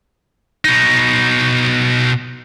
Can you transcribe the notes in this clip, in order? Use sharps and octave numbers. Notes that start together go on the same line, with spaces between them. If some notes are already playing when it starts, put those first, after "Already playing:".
B2 D#4